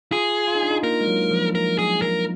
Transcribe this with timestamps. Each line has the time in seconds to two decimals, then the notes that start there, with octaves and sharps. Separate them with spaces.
0.12 F4 G#4
0.48 F4
0.55 D#4
0.63 D4
0.70 D#4
0.83 A#3 A#4
1.01 G#3
1.08 F#3
1.31 F3
1.55 A#4
1.79 G#4
2.02 A#4